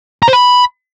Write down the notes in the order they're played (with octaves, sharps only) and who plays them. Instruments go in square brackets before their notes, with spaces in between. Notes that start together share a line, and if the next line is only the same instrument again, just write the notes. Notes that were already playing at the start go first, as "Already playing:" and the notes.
[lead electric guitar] A#5
C5
B5